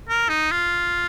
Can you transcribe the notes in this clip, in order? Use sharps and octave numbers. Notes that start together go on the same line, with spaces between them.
A#4
D#4
F4